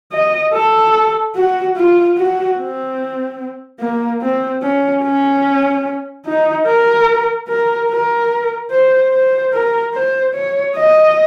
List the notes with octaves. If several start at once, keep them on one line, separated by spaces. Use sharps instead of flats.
D#5
A4
F#4
F4
F#4
C4
A#3
C4
C#4
C#4
D#4
A#4
A#4
A#4
C5
C5
A#4
C5
C#5
D#5